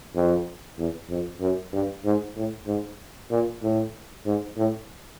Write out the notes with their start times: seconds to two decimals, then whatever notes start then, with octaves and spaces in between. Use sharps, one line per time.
0.15 F2
0.78 E2
1.09 F2
1.40 F#2
1.73 G2
2.05 G#2
2.36 A2
2.67 G#2
3.30 A#2
3.62 A2
4.26 G#2
4.57 A2